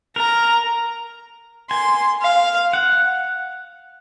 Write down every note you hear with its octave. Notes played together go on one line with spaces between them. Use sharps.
A#4 A#5
G#5 C6
F5
F#5